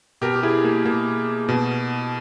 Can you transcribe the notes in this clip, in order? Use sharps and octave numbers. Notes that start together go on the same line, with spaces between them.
B2 G4 A#4
G4
E4 G#4
A#3
B2 A#3
B2